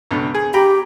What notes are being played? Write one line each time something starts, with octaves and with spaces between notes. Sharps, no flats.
C#2 B2 D3
G#4
G4 G5 A#5 B5